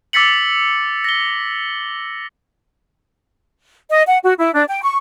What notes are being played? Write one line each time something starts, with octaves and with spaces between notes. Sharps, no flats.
D6 E6 A6 B6 C#7 F#7
A#6 G7
D#5
F#5
F#4
E4
D4
G5
C#6